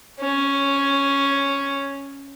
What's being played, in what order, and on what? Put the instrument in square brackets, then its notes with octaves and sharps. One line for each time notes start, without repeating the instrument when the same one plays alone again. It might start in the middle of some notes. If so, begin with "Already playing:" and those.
[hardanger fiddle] C#4